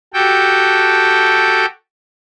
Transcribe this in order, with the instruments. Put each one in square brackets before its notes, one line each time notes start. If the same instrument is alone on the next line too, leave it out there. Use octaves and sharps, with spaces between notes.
[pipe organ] F#4 G4 A4 G5